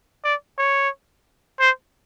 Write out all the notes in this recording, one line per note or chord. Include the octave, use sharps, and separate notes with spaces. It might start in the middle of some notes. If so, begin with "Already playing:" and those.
D5
C#5
C5